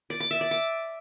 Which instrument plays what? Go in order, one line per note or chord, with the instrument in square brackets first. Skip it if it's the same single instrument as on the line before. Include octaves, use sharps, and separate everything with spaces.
[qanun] D5
D6
E5
D5
D6